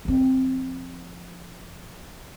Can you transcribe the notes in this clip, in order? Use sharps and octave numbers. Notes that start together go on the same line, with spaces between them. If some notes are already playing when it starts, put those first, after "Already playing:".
F3 C4